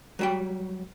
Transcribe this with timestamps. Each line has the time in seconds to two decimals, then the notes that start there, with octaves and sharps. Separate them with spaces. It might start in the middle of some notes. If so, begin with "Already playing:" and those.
0.19 F#3 G3 G5